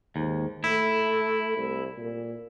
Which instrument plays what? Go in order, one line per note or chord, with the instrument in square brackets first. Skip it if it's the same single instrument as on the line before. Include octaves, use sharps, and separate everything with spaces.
[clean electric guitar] D#2 [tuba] G#2
[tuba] A3 [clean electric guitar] E4
[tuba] C2
A#2